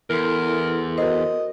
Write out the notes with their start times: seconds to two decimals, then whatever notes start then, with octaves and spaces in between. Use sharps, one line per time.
0.10 E2 E4 A4 A#4 C6
0.98 F#4 A#4 C5 D#5